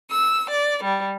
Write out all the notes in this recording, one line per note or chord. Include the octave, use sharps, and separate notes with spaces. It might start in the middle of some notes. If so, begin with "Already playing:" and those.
E6
D5
G3